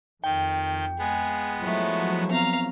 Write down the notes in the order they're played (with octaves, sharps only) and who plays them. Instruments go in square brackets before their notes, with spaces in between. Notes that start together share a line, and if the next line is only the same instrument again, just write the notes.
[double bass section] F2 [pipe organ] D#3 G6 [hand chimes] G5
[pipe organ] G#3 B3 [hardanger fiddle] G#4
[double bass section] F3 F#3 [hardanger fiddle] A3 E4
[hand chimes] B3 C4 [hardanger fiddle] F5 A#5